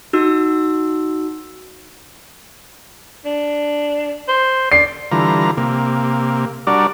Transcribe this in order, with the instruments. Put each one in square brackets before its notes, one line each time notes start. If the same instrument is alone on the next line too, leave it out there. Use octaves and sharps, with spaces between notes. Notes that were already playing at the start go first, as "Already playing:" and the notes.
[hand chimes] D#4 F#4 E6
[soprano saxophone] D4
C5
[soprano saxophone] D5 [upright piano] C7
[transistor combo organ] D3 E3 G3 F4 A#5
C3 A#3
G3 D4 F#4 A#4 D5